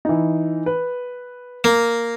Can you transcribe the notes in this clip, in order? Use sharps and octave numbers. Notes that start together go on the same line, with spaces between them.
E3 D#4
B4
A#3